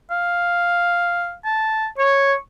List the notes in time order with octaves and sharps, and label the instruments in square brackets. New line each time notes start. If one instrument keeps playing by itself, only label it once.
[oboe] F5
A5
[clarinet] C#5 [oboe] C#6